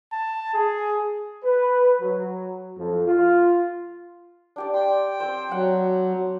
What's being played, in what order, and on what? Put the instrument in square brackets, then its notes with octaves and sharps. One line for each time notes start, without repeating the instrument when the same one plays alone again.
[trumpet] A5
G#4
[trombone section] B4
F#3
F2
F4
[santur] D4 G4 D5
[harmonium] G5 [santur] C6
[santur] C4 C5
[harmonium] F#3 [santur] F#5